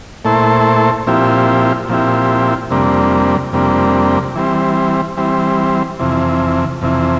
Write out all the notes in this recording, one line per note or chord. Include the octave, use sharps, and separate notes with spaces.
A#2 A3 E4 A4 C5
A#2 F3 C4 E4 G4
A#2 F3 C4 E4 G4
F2 C3 G3 A#3 D4
F2 C3 G3 A#3 D4
E3 G3 C4
E3 G3 C4
F2 C3 E3
F2 C3 E3